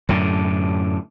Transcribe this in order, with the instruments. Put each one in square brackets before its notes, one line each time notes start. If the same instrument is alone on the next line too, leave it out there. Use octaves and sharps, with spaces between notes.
[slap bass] F#2 A2 D3